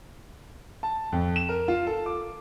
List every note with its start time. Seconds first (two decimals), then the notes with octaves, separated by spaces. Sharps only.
0.83 A5
1.12 F2
1.36 E7
1.49 A#4
1.68 F4
1.86 A4
2.06 D6